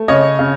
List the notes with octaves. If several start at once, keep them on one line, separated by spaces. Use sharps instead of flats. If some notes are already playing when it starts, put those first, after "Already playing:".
Already playing: A3
C#3 C#5 D#5
C#3